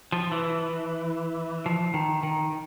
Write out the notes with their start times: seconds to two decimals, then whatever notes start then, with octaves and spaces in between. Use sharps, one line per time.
0.12 F3
0.32 E3
1.66 F3
1.94 D#3
2.23 D#3